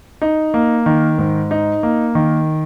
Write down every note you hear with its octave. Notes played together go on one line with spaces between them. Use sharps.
D#4
A#3
D#3
G#2
D#4
A#3
D#3